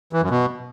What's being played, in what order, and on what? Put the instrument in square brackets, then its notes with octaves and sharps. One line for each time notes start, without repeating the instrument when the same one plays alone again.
[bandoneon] E3
F#2
B2